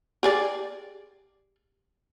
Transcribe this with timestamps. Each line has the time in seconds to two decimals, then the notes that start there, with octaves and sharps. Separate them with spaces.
0.23 G4 G#4 D5